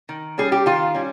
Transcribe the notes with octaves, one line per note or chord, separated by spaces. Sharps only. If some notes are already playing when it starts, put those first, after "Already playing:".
D#3
G3 C#4 G#4
G4
D#3 F4
G3 C#4